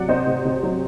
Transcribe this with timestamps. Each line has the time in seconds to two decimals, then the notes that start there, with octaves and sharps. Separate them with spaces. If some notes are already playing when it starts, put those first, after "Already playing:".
Already playing: C3 F#3 D5 F#5
0.09 C4 C5 D#5
0.27 C3
0.45 C3
0.63 F#3